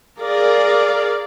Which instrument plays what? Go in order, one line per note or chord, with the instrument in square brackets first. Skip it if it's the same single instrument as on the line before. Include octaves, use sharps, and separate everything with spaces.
[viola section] G#4 A#4 D5 F5